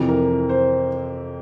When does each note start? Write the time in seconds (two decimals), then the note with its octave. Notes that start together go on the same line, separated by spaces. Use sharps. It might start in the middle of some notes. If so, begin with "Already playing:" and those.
Already playing: F2 C3 E3
0.09 A#4
0.49 C5